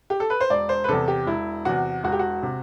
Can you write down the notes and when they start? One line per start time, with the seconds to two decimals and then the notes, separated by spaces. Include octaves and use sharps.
0.10 G4
0.20 A4
0.30 B4
0.41 C5
0.50 E1 D5
0.69 C5
0.84 B4
0.88 E2 C3 A4
1.08 G4
1.27 E1 E4
1.65 E2 C3 F#4
2.04 E1 F#4
2.12 G4
2.19 F#4
2.43 C3